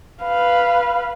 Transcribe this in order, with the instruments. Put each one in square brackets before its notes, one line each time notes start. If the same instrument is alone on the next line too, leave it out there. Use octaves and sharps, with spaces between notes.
[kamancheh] B4 F5